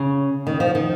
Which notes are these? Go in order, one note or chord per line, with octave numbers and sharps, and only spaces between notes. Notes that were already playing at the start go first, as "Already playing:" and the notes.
Already playing: C#3
D#3
F3
D#3